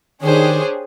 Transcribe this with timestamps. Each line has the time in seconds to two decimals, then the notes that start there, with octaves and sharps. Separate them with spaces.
0.22 D#3 D4 G4 G#4 C5 C#5